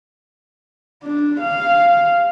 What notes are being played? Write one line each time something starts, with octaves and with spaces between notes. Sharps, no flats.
D4
F5